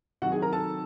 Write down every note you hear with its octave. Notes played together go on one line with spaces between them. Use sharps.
C3 D#3 F#3 F#4 F#5
G#4 G#5
A#4 A#5
A4 A5